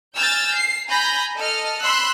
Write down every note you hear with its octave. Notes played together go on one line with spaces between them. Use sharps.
G#5 E6 F6 G6 A6
C7
G#5 A#5 B5 G6 A#6
A4 D#5 F6
B5 C6 E6 F#6